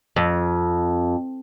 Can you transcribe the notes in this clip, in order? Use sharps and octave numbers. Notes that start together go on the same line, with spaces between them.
F2